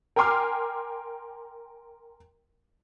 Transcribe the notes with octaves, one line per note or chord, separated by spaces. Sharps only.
A#4 G5 G#5 C6 D6 F6